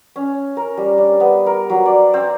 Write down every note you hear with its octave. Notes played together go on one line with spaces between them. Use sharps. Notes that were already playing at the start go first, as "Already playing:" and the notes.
C#4
A#4
G3
D4
B3
A#4
F#3
D5
C4